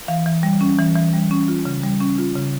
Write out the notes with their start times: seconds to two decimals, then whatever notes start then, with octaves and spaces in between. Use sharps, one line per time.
0.08 E3 F5
0.26 E3
0.43 G3
0.61 C#4
0.78 E3
0.96 E3
1.14 G3
1.31 C#4
1.48 F4
1.65 C#3
1.83 G3
2.00 C#4
2.18 F4
2.35 C#3